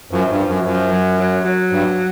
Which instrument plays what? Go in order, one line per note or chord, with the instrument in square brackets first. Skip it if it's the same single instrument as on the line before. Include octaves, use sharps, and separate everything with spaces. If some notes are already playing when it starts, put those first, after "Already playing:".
[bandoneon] F#2 [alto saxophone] F3
[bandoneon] G2
[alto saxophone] F3
[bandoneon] F#2
[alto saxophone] F#3
[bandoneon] F#2 [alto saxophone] F3
[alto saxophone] F#3
F#3
F#3
[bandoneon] G2